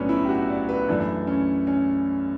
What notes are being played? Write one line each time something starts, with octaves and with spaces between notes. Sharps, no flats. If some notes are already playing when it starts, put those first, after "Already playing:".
Already playing: B1 A2 F#3 A3 C#4 D4 B4
E4
G4
F#4
D5
B4
F#2 E3 A3 D4
C#4
C#4